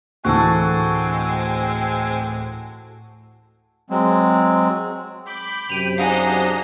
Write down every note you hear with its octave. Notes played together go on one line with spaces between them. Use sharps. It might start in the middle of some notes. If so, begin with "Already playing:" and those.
D2 A2 E3 G#3 C4 F#4 A4
F#3 G#3 C4
B5 D6 G6
F#2 C3 G5 D7 D#7 F7
D4 D#4 G#4 C5 F5 F#5 G#5 A#5